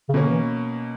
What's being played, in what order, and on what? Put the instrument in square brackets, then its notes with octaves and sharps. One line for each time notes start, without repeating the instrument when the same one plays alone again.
[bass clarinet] C#3
[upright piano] B2 A#3 C#4 [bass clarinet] D3
[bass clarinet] E3